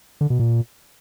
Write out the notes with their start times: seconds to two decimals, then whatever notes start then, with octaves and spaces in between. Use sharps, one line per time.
0.21 D3
0.30 B2
0.39 A#2